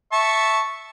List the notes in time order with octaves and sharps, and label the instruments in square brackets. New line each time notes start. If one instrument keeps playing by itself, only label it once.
[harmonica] E5 A5 C#6